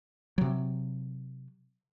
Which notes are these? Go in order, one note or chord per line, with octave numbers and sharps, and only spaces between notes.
C3 F#3